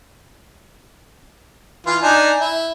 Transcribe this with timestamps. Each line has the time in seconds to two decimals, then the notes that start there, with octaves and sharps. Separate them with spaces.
1.86 E3 F4
2.03 D4 D#4 G#5
2.40 E4